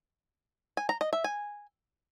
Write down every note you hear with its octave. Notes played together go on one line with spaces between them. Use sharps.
G#5
A#5
D#5
E5
G#5